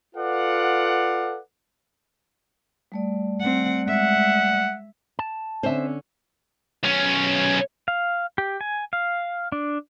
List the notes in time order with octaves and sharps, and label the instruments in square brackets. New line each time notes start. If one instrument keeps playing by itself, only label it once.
[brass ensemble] F4 A4 B4 D5 F5 F#5
[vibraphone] G3 A3 D5
[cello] C4 F#5
[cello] G#3 E5 [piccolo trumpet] F#5
[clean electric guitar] A5
[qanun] D3 C#4 [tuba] C4 [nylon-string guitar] C5 E5
[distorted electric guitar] B1 C#4
[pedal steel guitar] F5
G4
G#5
F5
D4